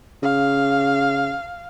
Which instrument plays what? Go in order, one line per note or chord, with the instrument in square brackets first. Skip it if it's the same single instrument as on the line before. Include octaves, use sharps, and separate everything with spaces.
[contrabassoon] C#3 [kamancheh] F5